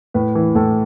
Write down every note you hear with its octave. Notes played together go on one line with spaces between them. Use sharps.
A2 B4
E3
A2 A4